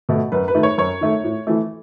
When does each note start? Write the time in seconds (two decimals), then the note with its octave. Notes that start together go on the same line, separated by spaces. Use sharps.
0.09 B2 A3
0.32 F#2 B4
0.48 B4
0.55 D#3 A3
0.63 C#5
0.78 F#2 C#5
1.01 D#3 A3
1.24 A2
1.47 E3 A3